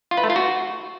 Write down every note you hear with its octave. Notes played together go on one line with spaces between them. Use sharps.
F4
B4
A3
F4
F#4